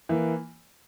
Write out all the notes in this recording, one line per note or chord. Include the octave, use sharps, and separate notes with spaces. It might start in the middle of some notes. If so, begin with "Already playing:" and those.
E3 A#3